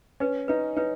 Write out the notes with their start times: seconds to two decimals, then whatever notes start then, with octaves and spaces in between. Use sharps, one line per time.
0.20 C#4 B4
0.48 D#4 B4
0.77 D#4 B4